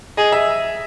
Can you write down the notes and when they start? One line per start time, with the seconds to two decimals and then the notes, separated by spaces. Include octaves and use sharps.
0.17 G#4 D#5
0.32 E5